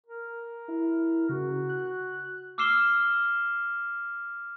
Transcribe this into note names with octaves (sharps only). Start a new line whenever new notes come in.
A#4
E4
C#3 F#4
F#6
D6 E6 F6 C7 E7 G7